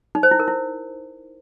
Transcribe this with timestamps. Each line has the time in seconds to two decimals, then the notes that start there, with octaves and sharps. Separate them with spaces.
0.15 D#4
0.23 C5
0.31 E4
0.40 A#4
0.48 E4